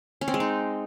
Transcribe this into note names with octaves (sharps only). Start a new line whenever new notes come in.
C#4
C4
G#3
D#4